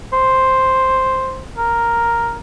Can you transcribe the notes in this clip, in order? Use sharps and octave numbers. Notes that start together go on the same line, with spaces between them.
C5
A#4